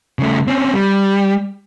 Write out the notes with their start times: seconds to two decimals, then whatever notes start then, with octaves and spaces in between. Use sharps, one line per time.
0.19 C#3 A3
0.47 C4 C#4
0.73 G3